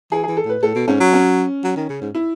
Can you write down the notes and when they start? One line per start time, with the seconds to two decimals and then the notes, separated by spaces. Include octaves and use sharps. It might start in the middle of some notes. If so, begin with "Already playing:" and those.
0.12 E3 G#4
0.23 E3 G#4
0.37 A4
0.45 A2 B4
0.62 A2 A4
0.75 B2
0.88 G#2 C#4
1.00 F#3
1.13 C#4
1.64 F#3
1.76 D#3
1.89 C#3
2.01 G#2
2.15 E4